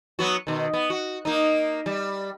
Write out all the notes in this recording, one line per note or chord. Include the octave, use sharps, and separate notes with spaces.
F#3 B3 F#4
B2 D#3
B3
F#4
A#3 D#4
G3